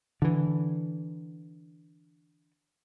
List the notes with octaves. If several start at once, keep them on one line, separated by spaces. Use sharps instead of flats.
D3 E3